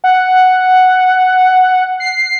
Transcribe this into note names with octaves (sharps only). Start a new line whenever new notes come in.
F#5
C7